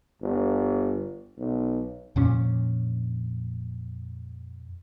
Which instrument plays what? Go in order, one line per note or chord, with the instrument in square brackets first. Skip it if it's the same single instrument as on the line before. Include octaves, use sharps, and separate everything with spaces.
[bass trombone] G1
B1
[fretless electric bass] F2 A#2 C#4